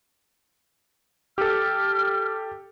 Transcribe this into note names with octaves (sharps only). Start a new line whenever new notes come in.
G4 A4 F6